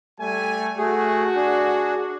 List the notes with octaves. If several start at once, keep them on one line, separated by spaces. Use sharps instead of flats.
G3 A3 G#5
A3 F#4 G#4
D4 G#4